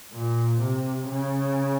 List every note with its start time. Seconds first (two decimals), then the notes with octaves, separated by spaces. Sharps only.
0.12 A#2
0.61 C3
1.08 C#3